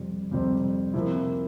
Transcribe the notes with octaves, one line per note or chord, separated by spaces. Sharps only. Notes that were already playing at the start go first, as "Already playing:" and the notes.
Already playing: F2 C3 G3 C4
F2 C3 G3 C4
C3 F3 A#3 E4